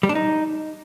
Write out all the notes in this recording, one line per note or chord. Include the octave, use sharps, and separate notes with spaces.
G3
D4
D#4